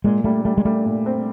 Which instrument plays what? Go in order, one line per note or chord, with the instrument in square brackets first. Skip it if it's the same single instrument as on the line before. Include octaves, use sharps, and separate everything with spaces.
[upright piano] A#2 [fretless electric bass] G#3
[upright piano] G3 [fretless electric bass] A3
[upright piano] G3 [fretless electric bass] A3
[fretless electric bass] G#3
[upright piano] G3 [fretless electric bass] A3
[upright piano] A#2
C4